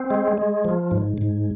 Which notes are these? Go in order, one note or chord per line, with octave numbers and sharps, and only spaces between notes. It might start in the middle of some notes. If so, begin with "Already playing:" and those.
Already playing: C4
G#3
G#3
F3
G#2
G#2